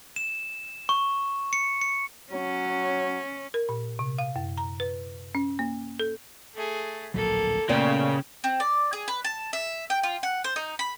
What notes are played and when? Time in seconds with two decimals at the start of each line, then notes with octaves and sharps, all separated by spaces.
0.16 E7
0.89 C#6
1.53 C#7
1.81 C#7
2.32 F#3 C#4
3.54 A#4
3.69 A#2
3.99 C3
4.18 F5
4.36 F#2
4.58 A#5
4.80 B4
5.35 C#4
5.59 A#3
6.00 A4
6.54 A3 G#4
7.14 D1 A#1 F#3 A#3 A4
7.69 A#2 C#3 A3 B3 D5 G5
8.44 C4
8.60 D5
8.93 G#4
9.08 B4
9.24 A5
9.53 E5
9.90 G5
10.03 F4
10.23 F#5
10.44 C5
10.56 D#4
10.79 B5